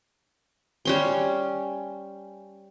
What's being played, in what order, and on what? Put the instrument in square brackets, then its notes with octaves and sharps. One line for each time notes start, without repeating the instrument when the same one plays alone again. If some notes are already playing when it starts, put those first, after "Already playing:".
[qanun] G3 C#4 C6